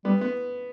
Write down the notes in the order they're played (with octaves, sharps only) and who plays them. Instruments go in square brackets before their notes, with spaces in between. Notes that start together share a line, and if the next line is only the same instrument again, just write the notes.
[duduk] G3 [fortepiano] B3
[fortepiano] B3